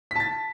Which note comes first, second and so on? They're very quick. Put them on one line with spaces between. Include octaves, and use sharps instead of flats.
B6 A5 A6